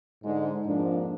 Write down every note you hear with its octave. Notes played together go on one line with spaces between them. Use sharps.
G#2 D3 G#3
F2 G#2 F3 A#3 D4